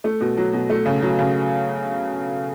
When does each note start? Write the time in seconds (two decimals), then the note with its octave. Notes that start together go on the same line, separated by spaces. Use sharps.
0.04 A3
0.20 B2
0.37 F#3
0.53 B2
0.70 A3
0.85 C#3
1.02 F#3
1.19 C#3